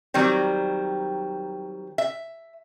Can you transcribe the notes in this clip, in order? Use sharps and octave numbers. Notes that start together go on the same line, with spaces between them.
D#3 F#3 G3 C4
E5